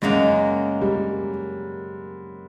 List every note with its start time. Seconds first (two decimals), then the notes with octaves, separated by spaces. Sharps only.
0.02 F#2 C#3 F#3 G#3 A#3 D#4
0.81 G3